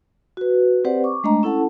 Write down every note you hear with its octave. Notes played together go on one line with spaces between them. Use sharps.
F#4 B4
C4 G4 B4 C5 D5 F#5
C#6 D6
G#3 A3 D4 D#5 A#5
C#4 E4 A4 F#5 A5